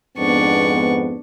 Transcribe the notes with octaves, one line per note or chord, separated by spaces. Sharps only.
F2 G#2 B3 D4 C#6